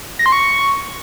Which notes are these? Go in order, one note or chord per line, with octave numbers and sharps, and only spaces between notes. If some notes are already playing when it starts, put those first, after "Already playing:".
A#6
C6
C#6